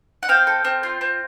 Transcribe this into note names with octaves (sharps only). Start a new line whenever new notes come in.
F#5
C4 F5 G5
A4
C4
F4
C4